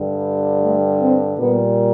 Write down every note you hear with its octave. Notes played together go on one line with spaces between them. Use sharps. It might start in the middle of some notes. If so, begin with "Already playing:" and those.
Already playing: G2 D3 G3
A3
C4
A#2 G3 B3